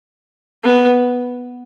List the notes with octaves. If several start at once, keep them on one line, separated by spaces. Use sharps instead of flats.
B3